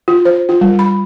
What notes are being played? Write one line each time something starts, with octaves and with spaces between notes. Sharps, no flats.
F4
C5
F4
G3
B5